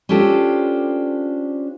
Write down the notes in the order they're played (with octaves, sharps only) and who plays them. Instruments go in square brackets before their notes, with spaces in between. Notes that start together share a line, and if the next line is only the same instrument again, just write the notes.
[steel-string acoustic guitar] C#4 D4 F4 G4 A4 C5